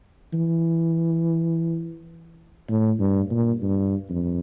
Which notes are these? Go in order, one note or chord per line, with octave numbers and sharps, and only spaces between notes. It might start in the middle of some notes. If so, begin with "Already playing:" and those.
E3
A2
G2
A#2
G2
F2